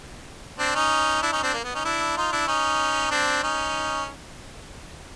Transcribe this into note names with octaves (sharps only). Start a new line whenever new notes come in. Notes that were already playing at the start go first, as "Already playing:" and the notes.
C4 D4
C#4 D#4
D4 E4
C#4 D#4
C4 D4
A#3
B3
C#4 D#4
D4 E4
D#4 F4
D4 E4
C#4 D#4
C4 D4
C#4 D#4